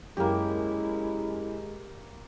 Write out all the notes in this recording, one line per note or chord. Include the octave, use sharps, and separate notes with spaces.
F#2 G#3 A#3 E4 G4